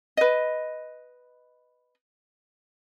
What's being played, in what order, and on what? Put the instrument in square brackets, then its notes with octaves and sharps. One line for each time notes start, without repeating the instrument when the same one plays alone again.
[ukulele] B4 D#5